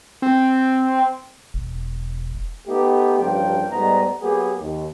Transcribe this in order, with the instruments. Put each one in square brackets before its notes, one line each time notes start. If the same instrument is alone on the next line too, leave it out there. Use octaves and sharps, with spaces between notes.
[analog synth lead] C4
[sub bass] E1
[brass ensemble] A3 B3 D#4 G4
A1 G2 C#3 F3 A#3 G5
G#2 G3 A3 B3 D#5 A#5
F#3 A#3 B3 G4 G#4
D#2